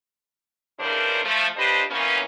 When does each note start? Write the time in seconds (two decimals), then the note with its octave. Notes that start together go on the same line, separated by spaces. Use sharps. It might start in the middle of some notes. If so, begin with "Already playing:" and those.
0.80 E2 G2 C#3 D4 A#4 C5
1.24 F3 A3
1.57 F3 D4 G4 B4 C5 D#5
1.90 E3 F3 A#3 B3 C#4